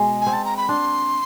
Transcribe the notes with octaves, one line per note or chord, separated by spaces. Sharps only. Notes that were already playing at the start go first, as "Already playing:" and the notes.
Already playing: B2 G#3
G#5
C4
A5
A#5
B5
D4 C6